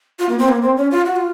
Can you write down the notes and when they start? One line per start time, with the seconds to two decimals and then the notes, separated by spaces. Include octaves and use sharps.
0.19 F4
0.29 A#3
0.39 C4
0.49 A#3
0.62 C4
0.77 C#4
0.91 F4
1.06 F#4
1.16 F4